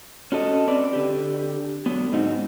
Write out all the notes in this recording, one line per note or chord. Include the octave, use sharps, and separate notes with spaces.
C#4 F#4 A4 D#5
C4 B4 D5
D3 G4
D3 F#3 B3
G#2 C4 D#4 F#4